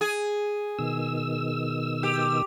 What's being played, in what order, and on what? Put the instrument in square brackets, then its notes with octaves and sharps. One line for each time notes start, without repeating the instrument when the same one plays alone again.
[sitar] G#4
[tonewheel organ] B2 D#3 E6
[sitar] G4